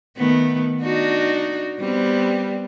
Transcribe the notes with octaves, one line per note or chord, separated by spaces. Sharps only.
D#3 A3 B3
D4 D#4 F#4
G3 B3 C4